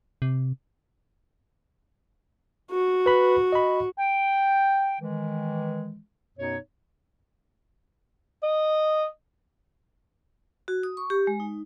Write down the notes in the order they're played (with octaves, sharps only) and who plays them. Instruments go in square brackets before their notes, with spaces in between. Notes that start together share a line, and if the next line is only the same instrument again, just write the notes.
[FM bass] C3
[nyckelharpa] F#4
[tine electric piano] B4 B5
D#5 B5
[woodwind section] G5
D#3 E3 G#3
F#2 B2 B3 D#4 C#5
[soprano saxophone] D#5
[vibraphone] F#4
D#6
C#6
G4
G#3
D#4